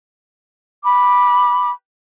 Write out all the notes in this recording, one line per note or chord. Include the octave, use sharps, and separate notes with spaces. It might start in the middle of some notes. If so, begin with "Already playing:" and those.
B5 D6